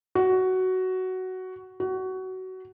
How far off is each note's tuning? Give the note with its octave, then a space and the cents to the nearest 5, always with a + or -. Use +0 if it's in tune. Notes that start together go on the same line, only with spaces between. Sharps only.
F#4 +10
F#4 +20